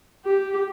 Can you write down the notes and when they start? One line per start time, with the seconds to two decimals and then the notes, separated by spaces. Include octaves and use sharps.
0.25 G4